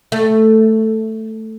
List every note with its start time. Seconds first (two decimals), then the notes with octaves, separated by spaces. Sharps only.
0.12 A3